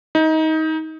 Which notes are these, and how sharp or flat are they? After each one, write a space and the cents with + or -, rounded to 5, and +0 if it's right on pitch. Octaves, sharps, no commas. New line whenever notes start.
D#4 +25